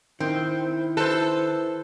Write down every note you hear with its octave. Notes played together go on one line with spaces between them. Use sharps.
D#3 C4 E4
A4 B4 C5